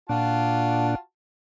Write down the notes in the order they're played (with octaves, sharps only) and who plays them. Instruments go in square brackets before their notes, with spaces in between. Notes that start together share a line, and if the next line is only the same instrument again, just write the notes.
[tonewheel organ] A#2 D4 [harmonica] F4 F#4 A5